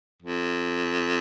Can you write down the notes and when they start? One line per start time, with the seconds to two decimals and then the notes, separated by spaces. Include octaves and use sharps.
0.22 F2